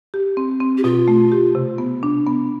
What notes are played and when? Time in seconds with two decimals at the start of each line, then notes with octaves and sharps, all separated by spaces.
0.14 G4
0.37 C4
0.60 C4
0.78 G4
0.84 B2 F4
1.08 A3
1.32 G4
1.55 C3
1.78 B3
2.03 D4
2.27 B3